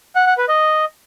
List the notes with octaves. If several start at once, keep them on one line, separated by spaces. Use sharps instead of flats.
F#5
F#5
B4
D#5